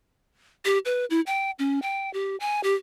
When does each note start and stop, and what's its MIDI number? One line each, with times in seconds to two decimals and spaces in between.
0.65 0.78 67
0.85 1.05 71
1.10 1.21 64
1.26 1.51 79
1.59 1.79 61
1.82 2.12 79
2.14 2.36 67
2.40 2.61 80
2.64 2.74 67